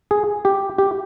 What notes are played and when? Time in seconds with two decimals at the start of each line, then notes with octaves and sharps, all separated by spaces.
0.11 G#4
0.45 G4
0.78 G4